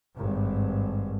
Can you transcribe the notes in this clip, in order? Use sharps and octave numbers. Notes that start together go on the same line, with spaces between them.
G#1 G2